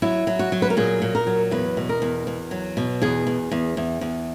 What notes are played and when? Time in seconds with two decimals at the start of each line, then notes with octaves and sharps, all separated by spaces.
0.02 F#3 E4
0.27 F#3
0.39 F#4
0.52 F#3
0.62 B4
0.70 A#4
0.77 A#2 G#4
1.02 A#2
1.15 A#4
1.27 F#3
1.51 E2 B4
1.77 B2
1.89 A#4
2.02 E2
2.27 E2
2.51 F#3
2.77 B2
3.02 E2 G#4
3.27 E2
3.52 E2
3.77 E2
4.01 E2